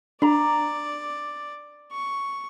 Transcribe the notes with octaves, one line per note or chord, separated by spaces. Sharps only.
D4 D5 A#5
C#6